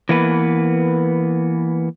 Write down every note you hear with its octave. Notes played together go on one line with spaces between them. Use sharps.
E3 A#3 B3 B4